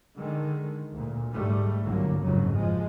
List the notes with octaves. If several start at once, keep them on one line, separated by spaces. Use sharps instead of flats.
D3 D#3 G#3
D2 A#2
G#2 G3 A3
G1 C2 D3 F#3 A#3
F#1 F2 G#2 C#3 F#3
F3 G#3